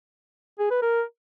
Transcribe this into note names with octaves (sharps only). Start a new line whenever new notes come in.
G#4
B4
A#4